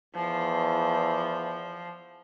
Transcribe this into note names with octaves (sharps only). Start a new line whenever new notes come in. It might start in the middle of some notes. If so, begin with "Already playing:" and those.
E2 F3